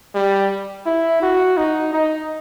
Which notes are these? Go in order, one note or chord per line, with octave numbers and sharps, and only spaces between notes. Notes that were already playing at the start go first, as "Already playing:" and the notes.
G3
E4
F#4
D#4
D#4